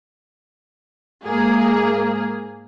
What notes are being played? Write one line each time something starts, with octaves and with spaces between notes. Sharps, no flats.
G#2 A#3 G#4